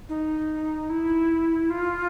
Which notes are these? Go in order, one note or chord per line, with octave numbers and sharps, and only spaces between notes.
D#4
E4
F4